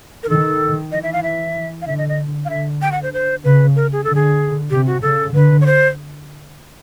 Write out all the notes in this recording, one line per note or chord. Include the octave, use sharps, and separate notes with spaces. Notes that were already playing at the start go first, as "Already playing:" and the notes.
A#4
D#3 A4
E3 D#5
E5
F5
E5
F5
D3 E5
D#5
D#5
F5
D3 E5
G5
F#5
C5
C5
C#3 B4
A#4
G#4
D3 A4
G#4
C3 G4
F#4
C#3 A4
D3 B4
C#5
C5